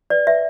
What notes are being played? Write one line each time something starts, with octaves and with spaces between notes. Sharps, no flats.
B4 D5
B4 E5